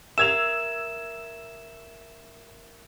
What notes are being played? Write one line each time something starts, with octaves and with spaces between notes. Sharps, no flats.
A#4 E5 E6 G#6 E7 F7